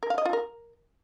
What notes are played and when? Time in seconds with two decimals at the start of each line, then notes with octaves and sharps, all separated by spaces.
0.03 A#4
0.10 F5
0.18 D#5
0.25 F4
0.33 A#4